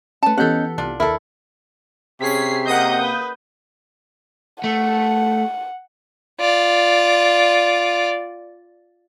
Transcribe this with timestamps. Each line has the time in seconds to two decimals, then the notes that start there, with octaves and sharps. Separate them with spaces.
0.23 A3 C#4 B4 A5
0.38 E3 B3 C#4 G4 A4 D#5 F#5 G6
0.78 C2 D4 F4
1.00 D#2 E4 A4 A#4
2.21 C3 C#4 G#4 B6 C7
2.66 A#3 D#5 F#5 D#6 G6
3.01 B4
4.64 A3 F#5
6.40 F4 D5